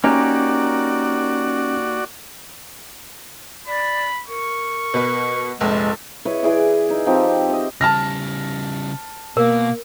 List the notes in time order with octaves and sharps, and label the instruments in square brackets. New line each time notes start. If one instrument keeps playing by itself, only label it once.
[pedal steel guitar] A#3 D#4 G4 [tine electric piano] C#4 [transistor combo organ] F#4 D5
[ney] D5 [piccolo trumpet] B5
[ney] A#4 [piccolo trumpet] C#6
[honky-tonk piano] B2 B4
[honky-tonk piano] F1 A#1 [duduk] G#3 [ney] A4
[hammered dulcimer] E4 B4 C#5 D#5
E3 E4 G#4 D5
D#4 E5
F3 C4 D#4 G4
D#5 E5
[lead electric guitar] C#3 G3 [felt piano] A5 F6 A#6
[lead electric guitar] B2 [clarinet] A#3 [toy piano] A#4